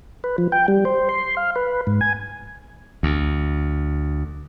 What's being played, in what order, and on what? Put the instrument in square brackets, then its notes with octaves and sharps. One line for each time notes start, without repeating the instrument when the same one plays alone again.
[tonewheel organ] B4
F3
G5
G3
C5
C6
F5
B4
G#2
G#5
[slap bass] D2